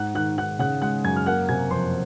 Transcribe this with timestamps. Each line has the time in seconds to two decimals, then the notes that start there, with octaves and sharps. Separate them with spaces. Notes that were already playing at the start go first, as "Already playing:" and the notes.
Already playing: G#2 F#5 F#6
0.15 D#3 F#5 F#6
0.37 D#3 F#5 F#6
0.59 C#3 F#5 F#6
0.82 G#3 F#5 F#6
1.04 F#2 G#5 G#6
1.16 F6
1.26 A#3 F#5 F#6
1.49 C3 G#5 G#6
1.71 F2 C5 C6